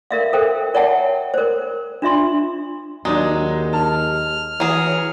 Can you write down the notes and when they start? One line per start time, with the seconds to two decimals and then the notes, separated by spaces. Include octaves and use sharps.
0.11 A#4 E5 F5
0.33 A4 A#4 C5 G5
0.74 A#4 C#5 E5 F#5 G5 A5
1.34 A#4 C5
2.02 D4 F4 E5 C6
3.05 D#2 F#3 G#3 D4 D#4
3.73 A5 F6
4.60 E3 F#3 G#4